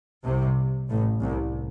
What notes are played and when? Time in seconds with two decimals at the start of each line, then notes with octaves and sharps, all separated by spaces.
0.24 C2 C3
0.89 A1 A2
1.21 C2 C3